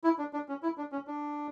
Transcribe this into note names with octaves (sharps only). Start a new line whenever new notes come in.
E4
D4
D4
C#4
E4
D4
C#4
D4